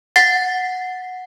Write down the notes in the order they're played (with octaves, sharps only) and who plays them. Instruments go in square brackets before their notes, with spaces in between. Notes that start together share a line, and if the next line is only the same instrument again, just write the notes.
[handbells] F#5 A6 C7